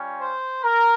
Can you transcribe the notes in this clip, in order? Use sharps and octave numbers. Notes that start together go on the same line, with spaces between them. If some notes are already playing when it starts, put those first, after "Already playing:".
Already playing: G3 C#4 F4
C5
A#4